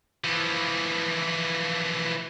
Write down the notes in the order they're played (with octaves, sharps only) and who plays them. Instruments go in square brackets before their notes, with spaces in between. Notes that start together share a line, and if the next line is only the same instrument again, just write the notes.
[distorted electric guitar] E3 F3